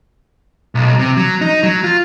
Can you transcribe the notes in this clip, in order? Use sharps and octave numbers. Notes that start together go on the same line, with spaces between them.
B1
C3
F#3
D#4
F#3
F4